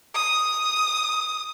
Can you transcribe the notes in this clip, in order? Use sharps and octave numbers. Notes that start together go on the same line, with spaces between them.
D#6